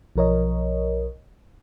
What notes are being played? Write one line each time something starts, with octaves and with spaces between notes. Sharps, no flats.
B1 F3 A#4 C#5 D#5